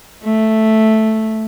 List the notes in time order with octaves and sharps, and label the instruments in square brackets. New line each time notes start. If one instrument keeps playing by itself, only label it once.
[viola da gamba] A3